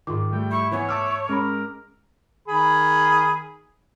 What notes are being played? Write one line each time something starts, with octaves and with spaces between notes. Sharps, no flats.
G#2 D#3 F4 D6
G3 A3 G5
E4 C#6
E3 B3 C#5 G#5
A3 A5 D6 E6 F6
G#3 C#4 A#4 B5
D#3 G#4 B5